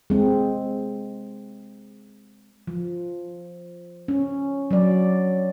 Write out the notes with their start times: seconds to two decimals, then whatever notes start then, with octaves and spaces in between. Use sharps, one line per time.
0.10 G#3 C4
2.67 F3
4.08 C#4
4.71 F#3 D5